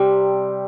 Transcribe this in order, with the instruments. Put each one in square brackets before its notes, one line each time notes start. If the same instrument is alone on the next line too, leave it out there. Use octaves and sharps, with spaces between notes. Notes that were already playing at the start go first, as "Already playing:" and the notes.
Already playing: [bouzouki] C3 G3